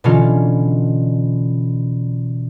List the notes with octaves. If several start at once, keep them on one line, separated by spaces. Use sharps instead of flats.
B2 D3 E3 C#4 F4